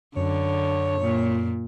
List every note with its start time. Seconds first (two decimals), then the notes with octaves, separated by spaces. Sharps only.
0.16 F#2 D3 C#5
1.01 A#2